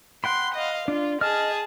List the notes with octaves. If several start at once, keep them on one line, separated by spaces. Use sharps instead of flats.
F#5 G5 B5 C6
D#5 F5
D4 F4
G#4 D#5 A5 F6